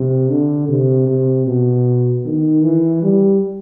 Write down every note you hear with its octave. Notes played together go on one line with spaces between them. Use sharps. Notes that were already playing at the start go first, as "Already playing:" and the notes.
Already playing: C3
D3
C3
C3
B2
D#3
E3
G3